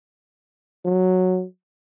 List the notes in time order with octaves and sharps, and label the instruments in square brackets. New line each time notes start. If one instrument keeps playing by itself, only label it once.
[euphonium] F#3